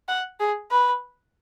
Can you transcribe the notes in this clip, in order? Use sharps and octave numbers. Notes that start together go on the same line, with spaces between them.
F#5
G#4
B4